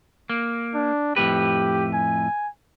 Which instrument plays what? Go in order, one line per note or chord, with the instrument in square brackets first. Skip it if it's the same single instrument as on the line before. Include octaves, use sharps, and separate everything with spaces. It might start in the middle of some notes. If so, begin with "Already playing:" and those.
[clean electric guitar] A#3
[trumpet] D4
[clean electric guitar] F2 A2 B4 [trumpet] G4
[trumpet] G#5